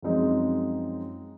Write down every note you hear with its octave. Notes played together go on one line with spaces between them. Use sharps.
F#2 F3 G#3 C4 D#4